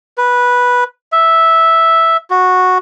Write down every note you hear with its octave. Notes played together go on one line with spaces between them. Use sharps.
B4
E5
F#4